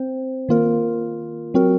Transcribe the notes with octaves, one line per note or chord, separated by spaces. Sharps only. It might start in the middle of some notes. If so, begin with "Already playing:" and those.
Already playing: C4 C5
D#3 A#3 F4 A#4
F#3 C4 F#4 A#4